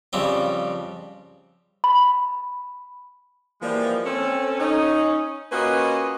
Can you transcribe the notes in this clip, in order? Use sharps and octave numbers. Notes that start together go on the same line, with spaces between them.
F2 C#3 G3 C4
B5
E3 F3 G3 G#3 A#3
C4 C#4 A4
C#4 D#4
A#3 C#4 F4 F#4 B4 D#5